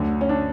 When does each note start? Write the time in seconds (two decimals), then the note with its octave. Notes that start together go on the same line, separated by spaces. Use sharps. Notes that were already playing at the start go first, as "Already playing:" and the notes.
Already playing: D2 D3 F#3
0.21 C#4
0.29 D4